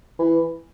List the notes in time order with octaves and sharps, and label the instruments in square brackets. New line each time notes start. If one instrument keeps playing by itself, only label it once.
[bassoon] E3